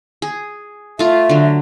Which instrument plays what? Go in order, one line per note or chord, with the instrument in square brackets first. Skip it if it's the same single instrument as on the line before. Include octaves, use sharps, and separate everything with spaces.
[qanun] G#4
[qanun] A3 F4 [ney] E5
[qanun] D3 F#3